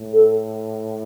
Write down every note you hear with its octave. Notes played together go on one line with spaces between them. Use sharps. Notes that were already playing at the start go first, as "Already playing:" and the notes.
Already playing: A2
A4